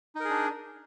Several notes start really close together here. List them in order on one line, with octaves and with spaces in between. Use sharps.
D#4 A#4 G#4 D4